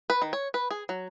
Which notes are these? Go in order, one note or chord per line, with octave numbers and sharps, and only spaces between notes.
B4
D#3
C#5
B4
G#4
F#3